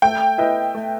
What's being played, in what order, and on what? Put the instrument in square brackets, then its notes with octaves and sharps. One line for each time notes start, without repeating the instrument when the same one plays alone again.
[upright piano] A3 [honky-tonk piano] G5
[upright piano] E4 B4 D#5
A3